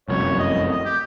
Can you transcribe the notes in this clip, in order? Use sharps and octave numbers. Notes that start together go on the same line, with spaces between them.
F1 C2 F#2 C#5
D#5
D#5
G4